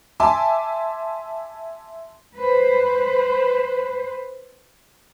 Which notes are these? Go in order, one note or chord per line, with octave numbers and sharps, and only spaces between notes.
E5 G#5 A5 C6 D6
B4 C5